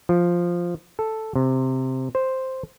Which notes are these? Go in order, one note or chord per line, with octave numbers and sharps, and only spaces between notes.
F3
A4
C3
C5